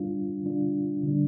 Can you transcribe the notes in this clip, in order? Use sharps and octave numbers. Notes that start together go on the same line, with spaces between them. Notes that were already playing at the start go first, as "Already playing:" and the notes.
Already playing: G3 D4 F4
G3 D4 F4
D3 G3 D4